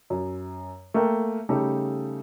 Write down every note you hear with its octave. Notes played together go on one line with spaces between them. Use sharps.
F#2
A3 A#3 A#4 G5
C#3 G3 A3 D#4 G4 A4